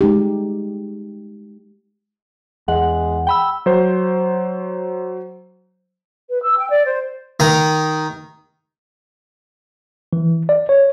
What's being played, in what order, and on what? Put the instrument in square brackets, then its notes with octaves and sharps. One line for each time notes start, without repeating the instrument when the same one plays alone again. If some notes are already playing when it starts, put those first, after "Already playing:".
[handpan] G#3 D#4 G4
[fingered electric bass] E2 [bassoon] G#3 [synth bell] F#5
[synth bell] G5 B5 E6
[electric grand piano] F#3 C5
[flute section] B4
E6
G5
D5
C5
[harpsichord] D#3 A#5
[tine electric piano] E3
D5
C#5